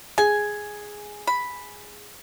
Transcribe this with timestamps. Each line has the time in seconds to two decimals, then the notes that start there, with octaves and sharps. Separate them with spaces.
0.18 G#4 G#5
1.27 B5